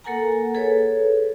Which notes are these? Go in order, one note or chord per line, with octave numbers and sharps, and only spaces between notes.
A#3 A4 A#4 F#5 G#5 A#5
G#4 A4 B4 C#5